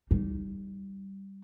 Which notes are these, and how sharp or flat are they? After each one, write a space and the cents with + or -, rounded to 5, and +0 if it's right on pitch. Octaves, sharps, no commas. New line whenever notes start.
G3 -5 D#4 -15